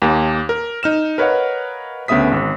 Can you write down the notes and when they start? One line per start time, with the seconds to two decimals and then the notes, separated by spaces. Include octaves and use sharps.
0.02 D#2 A#3
0.49 A#4
0.83 D#4 F6 E7
1.18 A#4 B4 C#5 D#5 F5 F#5
2.08 D2 C#3 B3 E5 D#6 B6
2.31 G#1